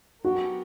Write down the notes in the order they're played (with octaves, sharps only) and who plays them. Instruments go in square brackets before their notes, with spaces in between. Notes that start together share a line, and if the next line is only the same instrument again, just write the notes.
[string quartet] F#3 B3 D4 G4 A#4 [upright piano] F#4